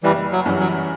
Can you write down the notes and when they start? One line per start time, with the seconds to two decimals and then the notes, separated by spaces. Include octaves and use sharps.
0.03 F#1 E3 G3
0.32 F#3
0.46 F#2 E3 G3 C#4
0.60 F#3